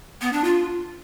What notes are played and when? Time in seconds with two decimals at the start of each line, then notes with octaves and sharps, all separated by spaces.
0.21 B3
0.33 D4
0.44 F4